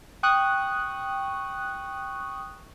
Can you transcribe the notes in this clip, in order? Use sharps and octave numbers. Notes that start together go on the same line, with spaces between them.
G5 C#6 D#6 F#6